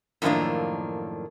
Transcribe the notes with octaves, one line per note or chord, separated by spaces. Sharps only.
F#2 A2 D#3 F3 A#3 D4